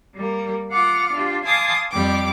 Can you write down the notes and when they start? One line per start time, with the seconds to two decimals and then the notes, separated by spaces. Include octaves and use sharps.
0.15 G3 A#3
0.71 F4 F#5 D6 F6
1.13 D4 F4 G4
1.45 F5 G#5 A5 C6 D6 D#6
1.91 F2 G3 G4 D6